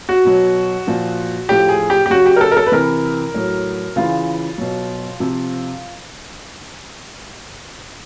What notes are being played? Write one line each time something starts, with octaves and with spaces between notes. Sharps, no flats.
F#4
B2 F#3
A#2 F3
A2 F3 G4
G#4
G4
G4
C#3 F#3 F#4
G4
A#4
A4
A#4
A4
B4
C3 E3 A#4
A2 F#3
C#3 E3 F4
B2 F#3
C3 F3